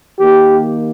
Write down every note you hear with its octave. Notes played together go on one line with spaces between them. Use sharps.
D#3 A#3 G4